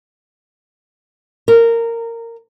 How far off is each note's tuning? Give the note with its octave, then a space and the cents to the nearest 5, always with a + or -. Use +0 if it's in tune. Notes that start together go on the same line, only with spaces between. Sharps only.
A#4 -15